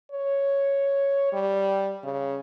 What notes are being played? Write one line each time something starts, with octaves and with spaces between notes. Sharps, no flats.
C#5
G3
C#3